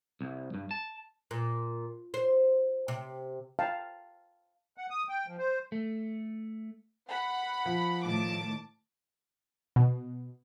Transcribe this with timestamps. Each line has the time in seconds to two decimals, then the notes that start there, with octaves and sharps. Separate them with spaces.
0.21 C2
0.54 G2
0.71 A5
1.31 A#2
2.14 C5
2.88 C3
3.59 F5 G5 A5
4.78 F#5
4.90 D#6
5.09 G5
5.26 F3
5.38 C5
5.72 A3
7.10 F#5 B5
7.66 F3
8.04 A2 D#3 A5 D6
9.76 B2